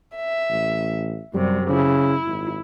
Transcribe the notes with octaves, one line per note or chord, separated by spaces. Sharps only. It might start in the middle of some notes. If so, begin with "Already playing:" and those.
E5
A1
F#2 C3 G3
C#3 E4
G#1